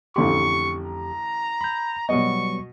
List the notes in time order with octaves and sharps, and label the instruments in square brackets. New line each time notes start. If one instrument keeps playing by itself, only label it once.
[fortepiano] A1 D3 C6 [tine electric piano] F2 G4 [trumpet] C#6
[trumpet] A#5
[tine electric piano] B5 G6
[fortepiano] B2 D#5 [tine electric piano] F#3 G3 B3 [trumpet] C#6